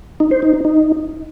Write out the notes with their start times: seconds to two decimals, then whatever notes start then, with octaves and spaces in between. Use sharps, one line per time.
0.20 D#4
0.31 C5
0.42 D#4
0.53 D#4
0.65 D#4